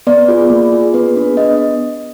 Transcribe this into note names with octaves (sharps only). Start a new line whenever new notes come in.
B3 D5
F4 G#4
A#3
F4 G#4
B3 B4
D4 G#4
B3 D#5